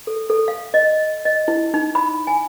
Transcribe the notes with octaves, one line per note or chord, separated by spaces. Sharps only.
A4
A4
F5
D#5
D#5
E4
D#4
B5
G#5